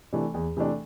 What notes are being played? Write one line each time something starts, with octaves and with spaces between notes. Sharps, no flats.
C3 E3 A3 D4
E2
C3 E3 A3 D4